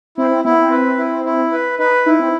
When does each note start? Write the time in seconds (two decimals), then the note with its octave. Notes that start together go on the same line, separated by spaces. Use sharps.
0.17 C4 E4
0.31 C4
0.45 B3 E4
0.57 C4
0.71 B4
0.98 E4
1.25 E4
1.52 B4
1.78 D#4 B4
2.06 D#4 E4
2.19 C4